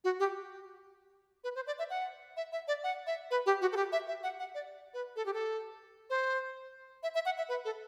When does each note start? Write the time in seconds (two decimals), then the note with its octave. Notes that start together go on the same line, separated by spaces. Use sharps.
0.04 F#4
0.20 G4
1.44 B4
1.55 C5
1.67 D5
1.79 E5
1.90 F#5
2.37 E5
2.52 E5
2.68 D5
2.84 F#5
3.07 E5
3.31 B4
3.46 G4
3.61 F#4
3.72 A4
3.77 G4
3.92 E5
4.08 E5
4.23 F#5
4.39 F#5
4.55 D5
4.94 B4
5.16 A4
5.26 G4
5.34 A4
6.10 C5
7.03 E5
7.15 E5
7.25 F#5
7.38 E5
7.49 B4
7.65 A4